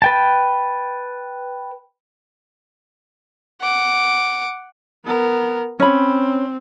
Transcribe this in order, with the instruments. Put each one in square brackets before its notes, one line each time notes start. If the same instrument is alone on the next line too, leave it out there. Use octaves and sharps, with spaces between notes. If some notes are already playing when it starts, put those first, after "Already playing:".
[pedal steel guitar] B4 G5 A5
[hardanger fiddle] F#5 D6
[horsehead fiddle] B3 A#4
[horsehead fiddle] C4 [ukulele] C#4 B5